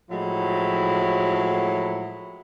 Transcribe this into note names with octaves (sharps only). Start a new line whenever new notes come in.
A2 F3 F#3 G#3 E4